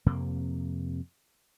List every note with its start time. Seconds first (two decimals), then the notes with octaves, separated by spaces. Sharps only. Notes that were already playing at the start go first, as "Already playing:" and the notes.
0.06 F2 C3 A#3